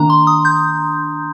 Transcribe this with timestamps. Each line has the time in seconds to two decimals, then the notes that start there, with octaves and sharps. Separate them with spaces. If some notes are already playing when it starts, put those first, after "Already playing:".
Already playing: D#3 A#3 D4 A#5
0.10 C6
0.27 D#6
0.45 G6